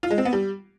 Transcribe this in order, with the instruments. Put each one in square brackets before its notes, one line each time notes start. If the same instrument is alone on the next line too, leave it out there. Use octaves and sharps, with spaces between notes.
[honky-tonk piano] F4
G#3
C4
B3
G3